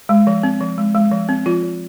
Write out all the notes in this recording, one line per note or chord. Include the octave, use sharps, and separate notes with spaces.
G#3
F3
C4
F3
G#3
G#3
F3
C4
F3 F4
F3